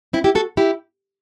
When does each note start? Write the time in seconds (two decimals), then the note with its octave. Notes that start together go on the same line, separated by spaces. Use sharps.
0.13 C4 E4
0.24 E4 G4
0.35 F#4 A4
0.57 E4 G4